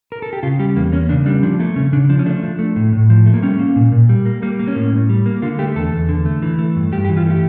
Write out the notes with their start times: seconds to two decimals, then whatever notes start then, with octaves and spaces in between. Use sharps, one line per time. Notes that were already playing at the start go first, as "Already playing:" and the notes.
0.12 A#4
0.22 A4
0.33 G4
0.43 C#3 F4
0.59 G3 G4
0.76 E2 A#3
0.92 A#3 C#4
1.09 C#3 D4
1.26 G3 D4
1.43 F3 D4
1.59 A3 A#3
1.76 C#3 C#4
1.93 C#3 D4
2.09 F3 D4
2.19 C#4
2.26 A3 D4
2.43 F3
2.59 A3
2.76 A2
2.93 A2
3.10 F3
3.26 A3
3.34 A#3
3.42 G3 C#4
3.59 A#3
3.76 A#2
3.92 A#2
4.09 G3
4.26 A#3
4.42 G3 A#3
4.59 A#3
4.68 C#4
4.75 A2
4.92 A2
5.09 G3
5.26 A#3
5.42 D3 F4
5.59 A3 G4
5.76 E2 A4
5.92 E2
6.09 D3
6.25 A3
6.42 E3
6.59 A3
6.76 G2
6.92 G2 G4
7.05 G4
7.09 E3
7.17 F4
7.26 A3 G4